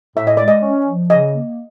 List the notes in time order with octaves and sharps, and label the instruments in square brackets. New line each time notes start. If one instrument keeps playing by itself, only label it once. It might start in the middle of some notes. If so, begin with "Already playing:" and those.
[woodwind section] A2 [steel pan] E5
[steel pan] D#5
[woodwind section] G#3 [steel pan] D5
[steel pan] D#5
[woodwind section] C#4
F3
[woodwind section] C#3 [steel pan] D#5
[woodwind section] A#3